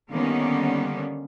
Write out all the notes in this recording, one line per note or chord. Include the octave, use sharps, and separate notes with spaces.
D3 D#3 G3 A#3 B3 C#4